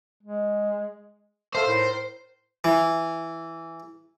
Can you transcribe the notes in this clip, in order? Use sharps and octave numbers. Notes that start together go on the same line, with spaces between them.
G#3
A4 C5 E5 F5
A2 D#4 A#4
E3